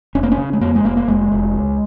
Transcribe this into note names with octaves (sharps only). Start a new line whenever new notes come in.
F1 C#4
A#3
C#4
C#3
G#3
F2 A#3
G#3
F1 A#3
A#3
F1 G#3
F1
C#2